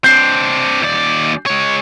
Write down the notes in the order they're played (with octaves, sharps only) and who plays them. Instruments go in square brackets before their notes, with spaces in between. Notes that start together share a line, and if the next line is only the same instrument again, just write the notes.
[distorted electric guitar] C4 D4 [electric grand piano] G6 C7
[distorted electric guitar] D#2 D5
G#3 C#5